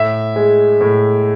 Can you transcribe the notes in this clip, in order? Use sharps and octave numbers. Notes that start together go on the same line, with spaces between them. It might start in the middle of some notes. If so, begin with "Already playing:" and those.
Already playing: A2 E5
G#3
A2